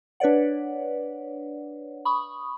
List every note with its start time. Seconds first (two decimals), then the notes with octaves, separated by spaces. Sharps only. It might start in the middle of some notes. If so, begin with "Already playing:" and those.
0.20 D4 B4 C#5 D5 F#5
2.05 B5 C#6 D#6